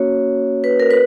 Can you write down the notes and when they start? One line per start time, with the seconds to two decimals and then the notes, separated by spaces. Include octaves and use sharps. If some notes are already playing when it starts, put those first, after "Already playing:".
Already playing: A#3 C#4 F#4 C#5
0.64 B4
0.80 A#4
0.91 B4